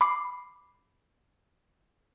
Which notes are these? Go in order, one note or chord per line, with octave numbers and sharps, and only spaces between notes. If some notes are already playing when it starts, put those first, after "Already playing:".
B5 D6 C7